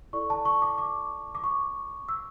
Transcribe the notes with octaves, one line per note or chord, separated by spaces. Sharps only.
E4 A4 D5 C#6
A5
C#6
D6
D6
D6
C#6
E6